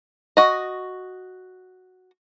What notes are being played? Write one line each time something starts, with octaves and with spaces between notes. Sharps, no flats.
F#4 D#5